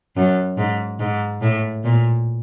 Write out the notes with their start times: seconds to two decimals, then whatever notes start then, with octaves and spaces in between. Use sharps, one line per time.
0.17 F#2
0.57 G#2
1.00 G#2
1.41 A2
1.84 A#2